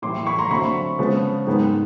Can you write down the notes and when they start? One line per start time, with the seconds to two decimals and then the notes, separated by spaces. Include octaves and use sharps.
0.02 A2 E3 G3 C6 D6
0.27 B5 C#6
0.39 A#5 C6
0.51 D3 F#3 A3 C4 B5 C#6
0.99 C#3 F3 G#3 B3
1.47 G#2 D#3 G#3 B3